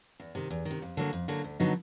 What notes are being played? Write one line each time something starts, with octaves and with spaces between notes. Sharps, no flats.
E2
C3 D#3
E2
D#3
C3
F2
D3 F#3 A#3
F2
D3 F#3 A#3
D2
D3 F#3 B3 D#4